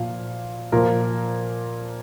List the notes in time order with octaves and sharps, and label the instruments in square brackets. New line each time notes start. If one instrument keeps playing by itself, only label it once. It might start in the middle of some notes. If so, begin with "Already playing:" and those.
Already playing: [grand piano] A#2 F3 F5
A#2 F3 A#4